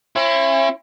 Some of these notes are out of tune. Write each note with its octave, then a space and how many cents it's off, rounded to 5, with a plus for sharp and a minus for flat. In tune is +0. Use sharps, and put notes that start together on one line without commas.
C#4 -40 E4 +30